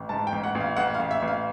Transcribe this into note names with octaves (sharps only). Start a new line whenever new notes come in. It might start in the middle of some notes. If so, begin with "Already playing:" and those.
Already playing: A1
G#2 A5
G5
A1
F#5
A1
F5
A1 F#5
F5
A1
E5
A1
F5